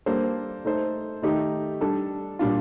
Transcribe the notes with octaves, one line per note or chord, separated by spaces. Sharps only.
G3 A#3 D4 A4 C5
A3 D#4 A4 C5
D#3 A3 D#4 G4
G3 D4 A4
A#2 G3 D4 F4